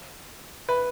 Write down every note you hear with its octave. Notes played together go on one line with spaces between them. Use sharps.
B4